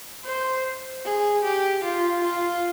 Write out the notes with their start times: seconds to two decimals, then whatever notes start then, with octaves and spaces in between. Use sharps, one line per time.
0.25 C5
1.05 G#4
1.44 G4
1.84 F4
2.24 F4